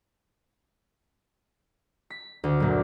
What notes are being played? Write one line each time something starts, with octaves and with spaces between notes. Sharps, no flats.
B6
D2
F#2 A#2